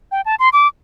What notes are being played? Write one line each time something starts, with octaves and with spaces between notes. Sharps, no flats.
G5
A5
C6
D6